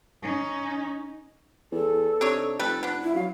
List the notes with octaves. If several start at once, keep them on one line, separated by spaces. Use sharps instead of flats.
C#4 D#4
E2 A4
C3 D4 D#4 C#5
F1 G3 A4 B4
B3 D4
E4
F#3 F5